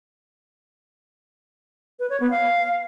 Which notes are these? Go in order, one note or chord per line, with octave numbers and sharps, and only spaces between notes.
B4
C#5
B3
F5